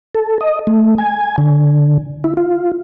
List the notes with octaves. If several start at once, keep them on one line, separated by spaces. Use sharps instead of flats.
A4
D#5
A3
G#5
D3
E4
F4